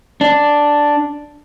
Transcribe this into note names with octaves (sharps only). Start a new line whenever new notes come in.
D4